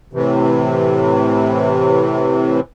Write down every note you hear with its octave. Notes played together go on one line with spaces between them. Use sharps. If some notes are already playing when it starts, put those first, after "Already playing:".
A2 C3 E3